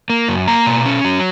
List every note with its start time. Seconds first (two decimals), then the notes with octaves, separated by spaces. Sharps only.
0.10 A#3
0.28 F#2
0.48 A#3 A#5
0.66 B2
0.86 C#4
1.05 F#3